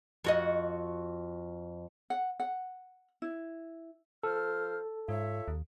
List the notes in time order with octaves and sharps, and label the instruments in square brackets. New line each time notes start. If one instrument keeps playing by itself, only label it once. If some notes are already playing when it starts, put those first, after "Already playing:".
[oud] F2 F#4 D#5
[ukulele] F#5
F#5
E4
[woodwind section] F3 C5 F6 [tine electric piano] A4
[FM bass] G#2 [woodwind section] F4 C#5 E5
[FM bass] D#2